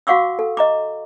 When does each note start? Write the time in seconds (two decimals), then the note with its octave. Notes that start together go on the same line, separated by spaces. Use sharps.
0.07 F#4 F5 F#5 C#6 D6 E6
0.39 A4
0.57 D#5 A#5 D6